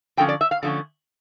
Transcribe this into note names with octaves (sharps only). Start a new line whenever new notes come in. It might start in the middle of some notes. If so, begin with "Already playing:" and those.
D3 F3 A3 C#4 G5
D5
E5
F5
D3 F3 A3 C#4